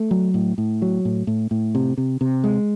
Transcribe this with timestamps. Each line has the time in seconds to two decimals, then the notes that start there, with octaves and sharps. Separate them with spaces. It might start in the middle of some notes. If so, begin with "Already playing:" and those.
Already playing: A3
0.11 F#3
0.34 A2
0.58 A2
0.82 F#3
1.05 A2
1.27 A2
1.51 A2
1.75 C3
1.98 C3
2.21 C3
2.44 G#3